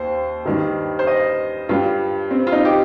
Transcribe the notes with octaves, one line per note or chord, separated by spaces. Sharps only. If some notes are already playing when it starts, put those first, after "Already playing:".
Already playing: D#2 C5
G2 D#3 G3
C5
D#5
G2 G3 F4
C4
F4
D#4
G4